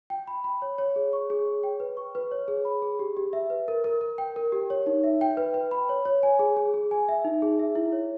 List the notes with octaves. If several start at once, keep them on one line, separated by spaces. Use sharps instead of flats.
G5
B5
B5
C#5
C#5
G#4
C#6
G#4
C#5
G5
B4
C#6
B4
C#5
G#4
B5
G#4
G4
G4
E5
B4
A#4
A#4
A#4
G5
A#4
G4
C#5
D#4
E5
G5
B4
B4
B5
C#5
C#5
G#5
G#4
G#4
G#4
G#5
E5
D#4
G#4
E5
E4
C#5